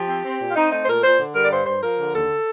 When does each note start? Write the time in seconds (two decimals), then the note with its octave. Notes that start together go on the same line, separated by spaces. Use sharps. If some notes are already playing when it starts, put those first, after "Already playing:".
Already playing: F3 G4
0.09 C4
0.25 C4
0.40 A#2
0.50 F4
0.56 C4 D#4
0.72 A3 D#4
0.82 C5
0.87 A#2 A#4
1.03 A#2 C5
1.19 D3
1.34 G3 A#4
1.44 D5
1.51 G2 C5
1.66 G2 C5
1.82 F3 A#4
1.98 D3
2.14 D#2 A4